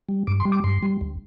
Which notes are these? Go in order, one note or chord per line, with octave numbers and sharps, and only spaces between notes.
G3
G2 D6
C6
G3
D6
G2 C6
G3
D2